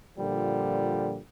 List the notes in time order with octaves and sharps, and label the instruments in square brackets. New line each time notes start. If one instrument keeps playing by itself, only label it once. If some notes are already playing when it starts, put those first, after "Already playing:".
[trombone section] A#2 D3 F3 G3